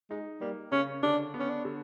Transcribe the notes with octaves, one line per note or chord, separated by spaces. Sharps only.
G#3 D#4
G3 A#3
C#3 C#4
D3 D4
B3
C#4
D4
D3